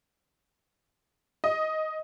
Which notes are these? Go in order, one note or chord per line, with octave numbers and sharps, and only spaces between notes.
D#5